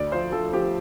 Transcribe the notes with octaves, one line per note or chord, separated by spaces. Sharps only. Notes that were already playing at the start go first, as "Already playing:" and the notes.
Already playing: D2 D5
F3 C5
F3 A4
F3 G4